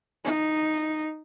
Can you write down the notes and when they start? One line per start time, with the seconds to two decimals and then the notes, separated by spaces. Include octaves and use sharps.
0.24 D#4